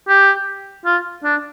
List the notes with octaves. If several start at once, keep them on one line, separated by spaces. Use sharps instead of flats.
G4
F4
D4